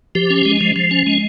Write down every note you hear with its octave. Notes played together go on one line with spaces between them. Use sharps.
F3 G4
C#4
G#3
F3
F3
C#4
G#3